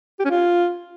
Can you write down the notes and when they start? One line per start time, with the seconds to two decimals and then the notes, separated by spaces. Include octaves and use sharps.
0.19 G4
0.25 C#4
0.30 F4